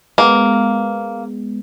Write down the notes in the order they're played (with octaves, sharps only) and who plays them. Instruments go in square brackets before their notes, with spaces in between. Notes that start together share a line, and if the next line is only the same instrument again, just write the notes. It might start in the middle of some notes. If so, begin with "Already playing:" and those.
[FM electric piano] G#3 B3 [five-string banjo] A#3